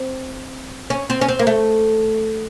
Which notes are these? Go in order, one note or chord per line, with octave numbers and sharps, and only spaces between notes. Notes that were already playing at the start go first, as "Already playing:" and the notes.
Already playing: C4
C#4
C4
C#4
C4
A#3
A3